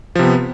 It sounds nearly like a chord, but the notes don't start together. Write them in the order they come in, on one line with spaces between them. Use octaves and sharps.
F3 C3 B3